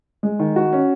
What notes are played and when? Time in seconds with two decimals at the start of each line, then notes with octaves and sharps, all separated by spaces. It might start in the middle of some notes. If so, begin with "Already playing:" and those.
0.23 G#3
0.39 D#3
0.56 F#4
0.73 C#4